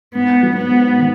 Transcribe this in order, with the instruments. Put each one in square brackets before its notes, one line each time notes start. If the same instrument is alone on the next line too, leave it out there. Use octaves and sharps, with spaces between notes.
[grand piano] G#2 [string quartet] B3
[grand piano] F#3
[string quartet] B3
[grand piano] G#2
D#3